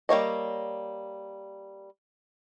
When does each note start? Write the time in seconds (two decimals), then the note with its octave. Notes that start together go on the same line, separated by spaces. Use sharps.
0.09 G3 A#3 C#5 D#5